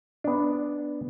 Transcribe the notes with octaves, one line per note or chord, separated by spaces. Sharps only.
B3 D4